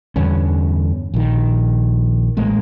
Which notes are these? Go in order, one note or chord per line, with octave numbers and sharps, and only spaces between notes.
E2 G2 D3 C#4
A#1 D#3
A1 G#3 A#3